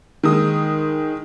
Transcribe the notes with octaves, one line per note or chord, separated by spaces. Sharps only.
D#3 G#3 D#6